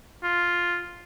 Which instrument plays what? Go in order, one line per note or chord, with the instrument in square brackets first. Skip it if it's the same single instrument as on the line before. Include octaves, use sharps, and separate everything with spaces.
[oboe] F4